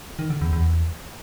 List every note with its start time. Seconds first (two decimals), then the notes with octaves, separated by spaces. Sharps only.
0.19 D#3
0.30 D3
0.41 E2
0.53 E2